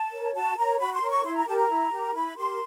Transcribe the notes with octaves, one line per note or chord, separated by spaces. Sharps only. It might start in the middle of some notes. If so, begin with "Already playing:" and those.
Already playing: A5
A#4 C#5
F#4 A5
A#4 C#5 A#5
F#4 B5
C6
A#4 C#5
C#6
E4 C6
A#5
G4 A#4 A5
A#5
E4
G4 A#4
E4 B5
G4 A#4 C6